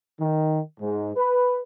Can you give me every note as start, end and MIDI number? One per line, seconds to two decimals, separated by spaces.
0.20 0.59 51
0.80 1.12 44
1.17 1.59 71